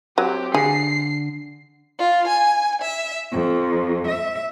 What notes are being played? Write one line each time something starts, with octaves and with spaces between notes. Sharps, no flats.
F#3 C4 G4
D3 G#4 C7
F4
G#5
E5
F2
E5